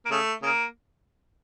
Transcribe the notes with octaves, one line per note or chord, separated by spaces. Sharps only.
A#3
C#3 A3
C#3 A#3